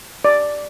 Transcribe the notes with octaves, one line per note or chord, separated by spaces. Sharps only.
D5